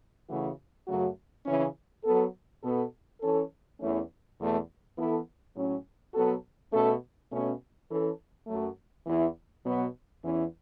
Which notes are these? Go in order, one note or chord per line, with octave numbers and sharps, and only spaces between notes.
C#3 E3 A3 F#4
F#2 C#3 F#3 A3 F#4
C#3 E3 C#4
F#3 B3 A4
B2 B3 A4
E3 C#4 A4
E2 E3 A3 C#4
E2 B2 A3
E3 B3 E4 A4
A2 F#3 C#4
B2 F#3 B3 F#4 A4
B2 A3 C#4 A4
B2 A3 C#4
E3 C#4 A4
F#2 F#3 A3
E2 E3 B3 E4
B2 F#3 B3
E2 E3 C#4 E4